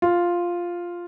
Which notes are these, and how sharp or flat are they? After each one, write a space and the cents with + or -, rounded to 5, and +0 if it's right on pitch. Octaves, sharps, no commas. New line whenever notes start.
F4 +0